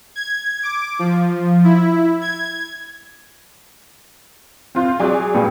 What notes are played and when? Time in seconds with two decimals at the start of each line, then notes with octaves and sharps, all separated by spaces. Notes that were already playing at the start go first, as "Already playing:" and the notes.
0.16 G#6
0.63 D6
0.99 F3
1.64 E4
2.21 G#6
4.75 C4 F4 G6
5.00 F#3 G#4 D5 G#5
5.35 G2 A#2